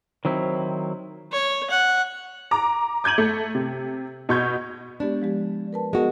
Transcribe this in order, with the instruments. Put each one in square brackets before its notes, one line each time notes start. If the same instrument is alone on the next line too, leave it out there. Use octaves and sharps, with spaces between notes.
[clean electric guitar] D#3 F#3 C4 E4
[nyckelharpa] C#5
F#5
[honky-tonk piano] A#5 D6
D6 G6 G#6 D#7 F#7
A3
C3
B2 C#6 G6 G#6
[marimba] G#3 B3 G4 [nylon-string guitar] D4
[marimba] F3 G#3 G4
A#4 B4 A5
[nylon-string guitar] G#3 F#4 [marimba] B3 G#4 A#4